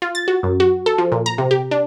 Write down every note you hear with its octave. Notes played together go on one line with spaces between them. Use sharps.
F4
A6
F#4
F#2
F#4
A4
F3
A#2
A#5
C3
G4
D4